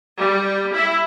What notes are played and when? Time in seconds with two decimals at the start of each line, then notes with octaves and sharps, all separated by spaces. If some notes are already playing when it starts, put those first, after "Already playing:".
0.19 G3
0.74 E4